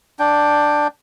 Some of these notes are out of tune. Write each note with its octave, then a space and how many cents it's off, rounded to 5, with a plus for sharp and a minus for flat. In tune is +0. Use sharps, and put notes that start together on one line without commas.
D4 +5 G5 +5